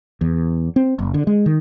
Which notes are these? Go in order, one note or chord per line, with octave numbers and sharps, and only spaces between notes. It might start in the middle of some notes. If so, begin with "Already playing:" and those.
E2
C4
F#1
D3
G#3
D#3